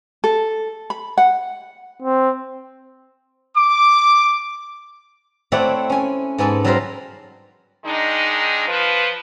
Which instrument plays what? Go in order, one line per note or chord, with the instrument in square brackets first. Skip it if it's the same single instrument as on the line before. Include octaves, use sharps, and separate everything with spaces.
[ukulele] A4
B5
F#5
[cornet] C4
[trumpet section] D6
[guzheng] A3 C4 E4 C#5 D5 F#5
C#4 G#5
G#2 B3 A4 G#5
F#3 G3 A4 A#4 C5 F5
[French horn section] D#3 G#3 D4 D#4
F3 B4